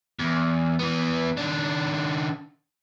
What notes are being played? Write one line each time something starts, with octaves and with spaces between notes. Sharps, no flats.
E2
E3 B3
D#3 D4